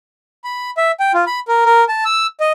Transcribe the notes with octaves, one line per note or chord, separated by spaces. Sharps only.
B5
E5
G5
F4
B5
A#4
A#4
A5
E6
D#5